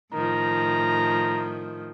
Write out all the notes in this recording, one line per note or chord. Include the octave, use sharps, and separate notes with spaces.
A2 D#3 F3 A#5